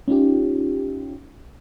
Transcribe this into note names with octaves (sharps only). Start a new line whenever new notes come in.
C#4 D#4 F4 G4